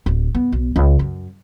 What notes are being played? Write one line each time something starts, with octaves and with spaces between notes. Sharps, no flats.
D1
B3
B1
C#2
F#2